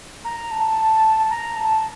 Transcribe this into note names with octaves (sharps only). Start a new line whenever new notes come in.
A#5
A5
A#5
A5